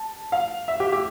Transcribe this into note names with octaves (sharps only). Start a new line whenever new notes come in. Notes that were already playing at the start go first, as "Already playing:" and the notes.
Already playing: A5
F5
E5
G4
G4